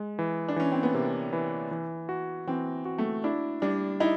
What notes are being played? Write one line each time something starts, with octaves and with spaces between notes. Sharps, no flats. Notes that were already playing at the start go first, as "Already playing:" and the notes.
Already playing: G#3
E3
D4
E3 C#4
C4
B3
C3 A#3
E3
E3
F#4
E3 C4
F#4
A3
D4 E4
G3 D4
D#4 E4